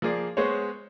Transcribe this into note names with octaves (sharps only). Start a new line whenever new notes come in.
F3 A#3 G#4 D5
G#3 B3 G#4 C5 C#5